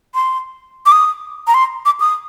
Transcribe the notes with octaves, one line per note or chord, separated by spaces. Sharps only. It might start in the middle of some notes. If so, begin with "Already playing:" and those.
C6
D6
D#6
A#5
C6
D6
D#6